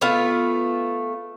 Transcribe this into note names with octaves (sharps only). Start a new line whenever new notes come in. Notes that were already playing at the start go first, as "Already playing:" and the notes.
A3 B3 F4